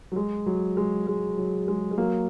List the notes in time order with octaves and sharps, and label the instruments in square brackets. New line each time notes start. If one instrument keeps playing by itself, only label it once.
[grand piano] F#3
G#3
F#3
G#3
G#3
F#3
G#3
G#3
F#3 A#3